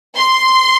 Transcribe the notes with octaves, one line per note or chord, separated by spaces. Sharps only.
C6